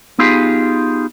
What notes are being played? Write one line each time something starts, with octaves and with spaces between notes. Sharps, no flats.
B3 D#4 F4 G4 G#4